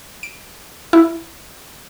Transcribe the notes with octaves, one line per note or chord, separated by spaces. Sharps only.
D7
E4